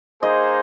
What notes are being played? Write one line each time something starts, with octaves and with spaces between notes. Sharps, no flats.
A#3 D#4 G#4 C5 D#5